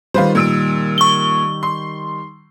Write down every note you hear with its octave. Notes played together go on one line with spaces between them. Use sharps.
D#3 G3 F4 B4 C5
A#2 E6 D7
C#6 G7
C6